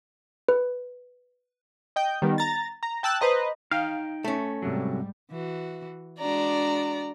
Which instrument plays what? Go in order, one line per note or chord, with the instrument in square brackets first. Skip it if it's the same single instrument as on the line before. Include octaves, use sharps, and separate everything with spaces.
[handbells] B4
[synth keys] D#5 G5 G6
D#3 G3 B3
A#5 A6
A#5
G5 A5 E6 F#6
B4 C5 D#5 A#5
[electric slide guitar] D#4 G5 [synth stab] F5
[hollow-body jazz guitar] A3 C#4
[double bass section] G#2 G3 [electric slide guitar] C3 F#3
[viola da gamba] E3 F#4
[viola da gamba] G#3 D4 F#4 [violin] D5 A#5